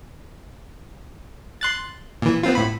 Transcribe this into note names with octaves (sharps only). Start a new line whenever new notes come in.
C6 F#6 A6
A#2 E3
B3 C4 F4
A2 B5